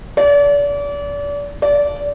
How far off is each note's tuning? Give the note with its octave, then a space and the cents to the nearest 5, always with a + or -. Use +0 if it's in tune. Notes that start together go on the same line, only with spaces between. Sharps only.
D5 -35
D5 -20